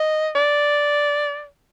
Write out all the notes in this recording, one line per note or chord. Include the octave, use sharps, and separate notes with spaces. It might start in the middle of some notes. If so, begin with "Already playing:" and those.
Already playing: D#5
D5